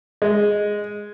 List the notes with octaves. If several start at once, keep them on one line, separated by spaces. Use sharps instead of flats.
G#3